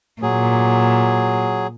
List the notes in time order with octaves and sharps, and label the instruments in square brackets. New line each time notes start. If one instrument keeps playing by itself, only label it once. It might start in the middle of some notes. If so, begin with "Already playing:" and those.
[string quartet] A#2 [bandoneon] F#3 G#4